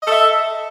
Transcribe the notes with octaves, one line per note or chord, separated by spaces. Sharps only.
A4 D#5 E5